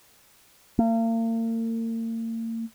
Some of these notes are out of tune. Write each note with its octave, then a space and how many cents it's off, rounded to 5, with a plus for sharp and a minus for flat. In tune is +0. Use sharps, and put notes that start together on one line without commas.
A#3 -40